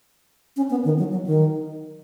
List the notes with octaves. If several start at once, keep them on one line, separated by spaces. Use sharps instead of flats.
C#4
B3
D#3
F#3
F#3
D#3